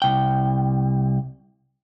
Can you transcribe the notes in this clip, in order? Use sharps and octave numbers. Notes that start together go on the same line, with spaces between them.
C2 G5